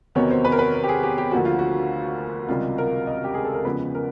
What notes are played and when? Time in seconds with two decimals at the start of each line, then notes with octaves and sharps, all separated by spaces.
0.15 E2 C3 D#3 F#3 B3 C#5
0.31 C5
0.45 B4
0.52 A#4
0.59 B4
0.74 A#4
0.84 G4
0.89 G#4
1.03 G4
1.18 G4
1.31 D2 D3 F3 A#3 F#4
1.45 F4
1.59 F#4
2.49 C#2 C3 D#3 G3 F4
2.78 A#4
3.07 D#5
3.24 G4
3.34 G#4
3.45 A4
3.54 A#4
3.65 E2 C#3 F3 G#3 B4
3.95 A#4